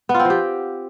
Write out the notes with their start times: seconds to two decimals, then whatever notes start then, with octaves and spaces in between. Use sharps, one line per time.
0.09 B3
0.14 F4
0.20 C4
0.25 F3
0.30 G4